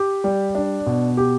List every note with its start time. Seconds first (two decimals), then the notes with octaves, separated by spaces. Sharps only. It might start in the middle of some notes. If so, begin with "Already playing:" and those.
Already playing: G4
0.24 G3
0.55 D4
0.86 B2
1.17 G4